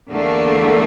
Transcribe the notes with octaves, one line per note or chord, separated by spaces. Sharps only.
E2 D3 A3 A#3